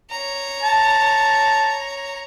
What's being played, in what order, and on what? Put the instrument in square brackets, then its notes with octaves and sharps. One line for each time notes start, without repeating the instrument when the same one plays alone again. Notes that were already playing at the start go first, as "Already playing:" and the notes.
[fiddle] C#5 A#5
[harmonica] A5